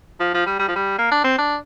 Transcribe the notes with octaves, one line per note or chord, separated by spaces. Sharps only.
F3
F3
G3
G3
F3
G3
A#3
D4
C4
D4